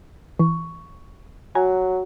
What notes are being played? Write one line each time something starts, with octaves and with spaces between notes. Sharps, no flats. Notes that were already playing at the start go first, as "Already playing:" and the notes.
E3 C#6
F#3 F#4 G#5 A#5